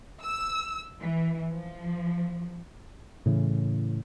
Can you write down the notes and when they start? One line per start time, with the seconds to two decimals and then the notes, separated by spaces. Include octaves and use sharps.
0.22 E6
1.00 E3
1.51 F3
3.26 A2 C#3 E3